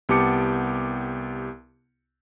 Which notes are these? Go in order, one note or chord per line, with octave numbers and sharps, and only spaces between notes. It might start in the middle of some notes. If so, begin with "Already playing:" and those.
C2 B3 G4 A5 D6 C#7